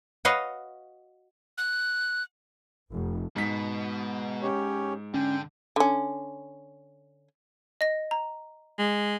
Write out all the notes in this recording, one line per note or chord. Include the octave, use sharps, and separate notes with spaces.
F#4 B4 C#5 D#5 F5
F#6
F1
G#2 B2 B6
C#4 G4 C#5
D3 C#4 G5
D3 C#4
D#5 A#6
A#5
G#3